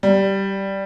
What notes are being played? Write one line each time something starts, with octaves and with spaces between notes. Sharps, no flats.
G3